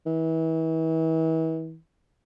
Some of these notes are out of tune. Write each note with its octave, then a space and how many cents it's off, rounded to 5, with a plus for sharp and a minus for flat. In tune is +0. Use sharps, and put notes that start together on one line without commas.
E3 -35